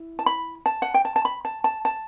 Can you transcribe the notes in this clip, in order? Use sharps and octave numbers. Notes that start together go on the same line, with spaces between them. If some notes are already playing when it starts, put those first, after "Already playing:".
Already playing: E4
A5
B5
A5
F#5
G5
A5
A5
B5
A5
A5
A5